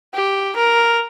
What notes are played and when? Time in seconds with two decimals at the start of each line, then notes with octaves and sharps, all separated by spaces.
0.14 G4
0.56 A#4